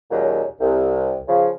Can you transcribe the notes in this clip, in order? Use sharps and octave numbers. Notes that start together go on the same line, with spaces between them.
D#2 A#2 F#3 G#3 C#4
C2
C#3 F3